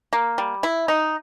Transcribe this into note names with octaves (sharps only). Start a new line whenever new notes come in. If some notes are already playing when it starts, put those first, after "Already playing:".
A#3
G3
E4
D#4